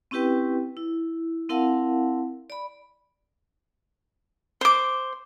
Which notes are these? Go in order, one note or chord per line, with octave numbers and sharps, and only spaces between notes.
C4 C#4 E4 G4 B4 G5
E4
C4 E4 A#4 F5 F#5 A5
D5 B5
C5 D6